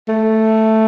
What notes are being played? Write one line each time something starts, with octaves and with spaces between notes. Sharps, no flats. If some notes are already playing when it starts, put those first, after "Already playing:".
A3